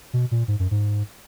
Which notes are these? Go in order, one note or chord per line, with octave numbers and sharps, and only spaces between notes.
B2
A#2
G#2
F#2
G#2